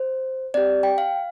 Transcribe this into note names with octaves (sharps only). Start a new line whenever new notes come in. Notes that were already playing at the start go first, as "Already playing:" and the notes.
Already playing: C5
C4 G4 D5
G5
F5